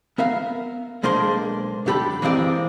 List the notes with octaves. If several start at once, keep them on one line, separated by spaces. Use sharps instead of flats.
B3 A#4 E5 F5
B1 G#3 A#3 D4 C5 C6
F#2 D3 G4 A4 B5
E3 G#3 A#3 C4 D5